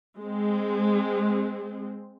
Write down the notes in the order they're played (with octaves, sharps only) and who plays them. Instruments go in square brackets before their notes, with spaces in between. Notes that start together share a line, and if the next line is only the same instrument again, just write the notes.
[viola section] G#3 C4